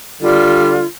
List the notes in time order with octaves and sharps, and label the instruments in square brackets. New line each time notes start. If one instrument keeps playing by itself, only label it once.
[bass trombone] D3 [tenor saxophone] G3 [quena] F4